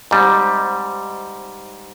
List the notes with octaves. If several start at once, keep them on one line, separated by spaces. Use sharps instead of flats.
G#2 G3 C4 D#4